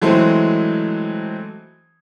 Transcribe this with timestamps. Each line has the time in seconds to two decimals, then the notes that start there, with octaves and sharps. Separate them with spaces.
0.02 E3 F#3 G#3 A3 C4